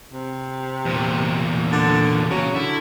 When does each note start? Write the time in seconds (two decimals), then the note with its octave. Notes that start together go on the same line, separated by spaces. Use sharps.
0.12 C3
0.85 E2 A#2
1.72 D3
2.31 C#3 F#3
2.55 D3 E4